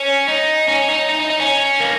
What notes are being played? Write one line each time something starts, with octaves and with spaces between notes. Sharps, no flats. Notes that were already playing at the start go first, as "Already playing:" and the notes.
Already playing: C#4
D#4
C#4
D#4
D#4
D#4
D#4
C#4
A#3